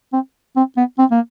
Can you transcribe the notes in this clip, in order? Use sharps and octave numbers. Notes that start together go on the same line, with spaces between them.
C4
C4
B3
C4
A#3